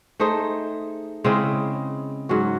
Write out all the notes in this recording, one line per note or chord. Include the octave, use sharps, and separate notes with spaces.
A3 D#4 G#4 C5
C#3 G#3 C4 E4
G#2 F#3 C#4 F#4